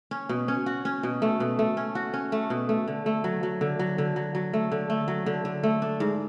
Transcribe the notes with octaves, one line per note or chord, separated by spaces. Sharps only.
C#4
B2
C#4
F#4
C#4
B2
A3
B2
A3
C#4
F#4
C#4
A3
B2
A3
D3
A3
F#3
F#3
D3
F#3
D3
F#3
F#3
A3
D3
A3
F#3
D3
D3
A3
D4
G#2